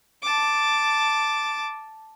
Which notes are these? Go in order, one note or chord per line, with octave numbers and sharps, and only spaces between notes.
A5 D6